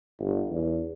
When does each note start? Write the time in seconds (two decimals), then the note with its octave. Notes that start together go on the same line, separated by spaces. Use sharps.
0.19 G1
0.50 E2